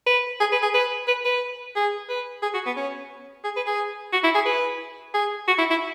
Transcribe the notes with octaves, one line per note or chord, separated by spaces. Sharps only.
B4
G#4
B4
G#4
B4
B4
B4
G#4
B4
G#4
F#4
B3
C#4
G#4
B4
G#4
F#4
E4
G#4
B4
G#4
F#4
E4
E4